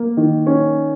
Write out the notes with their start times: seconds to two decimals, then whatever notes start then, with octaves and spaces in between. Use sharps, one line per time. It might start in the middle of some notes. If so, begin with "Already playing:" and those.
Already playing: A#3
0.17 D#3
0.47 C#4